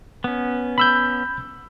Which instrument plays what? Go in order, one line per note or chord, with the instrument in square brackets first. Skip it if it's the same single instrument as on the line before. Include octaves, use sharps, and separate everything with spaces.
[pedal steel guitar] B3 C#4
[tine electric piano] B5 E6 G6